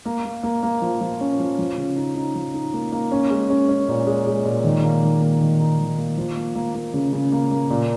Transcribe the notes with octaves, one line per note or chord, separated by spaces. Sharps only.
A#3
A#3
A#3
A#3
F3
F3
C#4
F3
F3
C#3
D#4
D#4
F3
D#4
A#3
A#3
C#4
G#3
C#4
C#4
A#2
G#3
G#3
A#2
D#3
A#3
D#3
A#3
D#3
D#4
D#3
A#3
F3
A#3
A#3
A#3
C#3
C#3
A#3
A#3
A#2